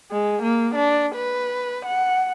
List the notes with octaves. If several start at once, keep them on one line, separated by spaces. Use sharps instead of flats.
G#3
A#3
D4
B4
F#5